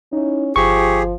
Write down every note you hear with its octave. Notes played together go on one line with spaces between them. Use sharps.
C#4 D#4 E4
G1 F3 G4 G#4 C#6